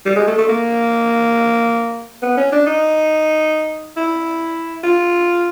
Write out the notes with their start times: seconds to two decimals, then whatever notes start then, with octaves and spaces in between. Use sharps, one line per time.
0.06 G3
0.16 G#3
0.27 A3
0.38 A3
0.49 A#3
2.22 B3
2.37 C#4
2.52 D4
2.66 D#4
3.97 E4
4.84 F4